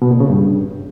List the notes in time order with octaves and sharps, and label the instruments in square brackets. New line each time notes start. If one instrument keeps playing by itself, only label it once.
[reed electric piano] B2
A#2
C#3
G2